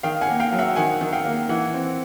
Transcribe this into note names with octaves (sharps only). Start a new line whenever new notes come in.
D#3 F5 G5
F#5 G#5
A#3
F5 G5
F#3
E5 F#5
D#3 F#5 G#5
D#3
F5 G5
A#3
E3 E5 F#5
C4